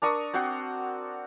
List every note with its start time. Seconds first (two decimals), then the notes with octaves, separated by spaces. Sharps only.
0.02 D4 A#4 C#6 D#6
0.33 C4 F#4 C5 F#5